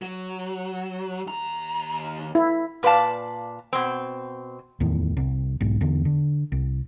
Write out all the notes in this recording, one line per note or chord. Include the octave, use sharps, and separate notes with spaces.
F#3
D#2 A#5
E4
A#2 B4 D5 F5 A5
B2 C4
D1 E2 A2 D#3
C2
B1 G#2
E2 D3
D3
C2